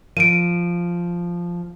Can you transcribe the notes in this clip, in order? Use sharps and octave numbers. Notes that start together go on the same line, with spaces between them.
F3 D7 D#7